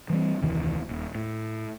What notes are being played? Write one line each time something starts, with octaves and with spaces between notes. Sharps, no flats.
E3 G3 C4
F1 D2 D#3 E3
D#1
A2